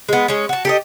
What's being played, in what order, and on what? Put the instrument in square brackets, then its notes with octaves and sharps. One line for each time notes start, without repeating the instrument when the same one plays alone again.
[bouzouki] G#3 B3
G#3 C#4
F#4 A5
G4 A4 D#5